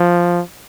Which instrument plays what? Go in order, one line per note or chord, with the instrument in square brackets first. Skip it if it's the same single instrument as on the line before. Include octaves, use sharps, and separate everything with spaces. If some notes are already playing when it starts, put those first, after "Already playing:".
Already playing: [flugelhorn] F3